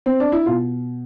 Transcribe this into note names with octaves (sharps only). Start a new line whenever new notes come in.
C4
D4
E4
B2 F4